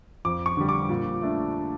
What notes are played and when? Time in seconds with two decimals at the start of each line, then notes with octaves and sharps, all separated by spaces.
0.25 F2 D6
0.46 C#6
0.57 D3 G3
0.69 D6
0.89 A#2
1.22 A3 D4